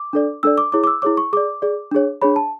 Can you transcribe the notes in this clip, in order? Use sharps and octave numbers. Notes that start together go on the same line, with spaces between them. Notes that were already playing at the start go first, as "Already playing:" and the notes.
Already playing: D6
D4 A4 D5
D4 A4 D5 E6
D6
E4 G#4 C#5 D6
D6
E6
E4 G#4 C#5 D6
C#6
G#4 D5 D6
G#4 D5
D4 G#4 C#5
D4 G#4 C#5 B5
A5